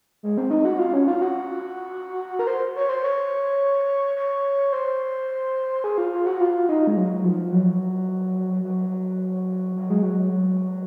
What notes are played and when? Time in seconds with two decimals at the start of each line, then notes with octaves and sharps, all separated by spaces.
0.23 G#3
0.38 C4
0.50 D#4
0.65 F#4
0.79 F4
0.93 C#4
1.08 F4
1.22 F#4
2.39 A#4
2.47 C5
2.76 C#5
2.89 C5
3.04 C#5
4.16 C#5
4.73 C5
5.84 G#4
5.98 F4
6.12 F4
6.26 F#4
6.41 F4
6.69 D#4
6.87 G#3
6.97 F#3
7.24 F3
7.53 F#3
8.64 F#3
9.77 F#3
9.90 G#3
10.03 F#3